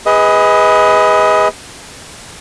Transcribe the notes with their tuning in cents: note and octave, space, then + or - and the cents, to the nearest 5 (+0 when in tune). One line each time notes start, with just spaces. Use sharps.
G#4 -20 B4 +0 D#5 +25